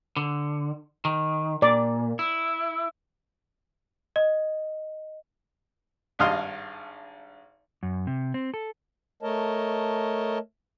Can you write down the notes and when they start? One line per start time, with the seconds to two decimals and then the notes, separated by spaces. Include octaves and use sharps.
0.16 D3
1.05 D#3
1.62 A#2 D5
2.19 E4
4.16 D#5
6.19 G#1 G2 D#5 F5 C6
7.83 F#2
8.07 C3
8.34 C4
8.54 A4
9.23 A3 A#4 C#5 D#5 A5